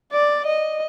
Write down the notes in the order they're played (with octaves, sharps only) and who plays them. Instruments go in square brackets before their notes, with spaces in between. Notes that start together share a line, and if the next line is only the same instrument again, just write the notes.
[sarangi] D5
D#5